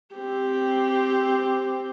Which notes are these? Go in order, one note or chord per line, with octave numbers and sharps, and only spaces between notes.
C4 G4